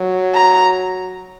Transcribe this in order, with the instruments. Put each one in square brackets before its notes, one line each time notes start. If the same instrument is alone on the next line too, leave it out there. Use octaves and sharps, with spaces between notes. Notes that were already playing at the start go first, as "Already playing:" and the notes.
Already playing: [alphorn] F#3
[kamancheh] A#5